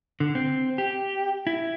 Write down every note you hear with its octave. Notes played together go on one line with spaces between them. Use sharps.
D3
C4
G4
E4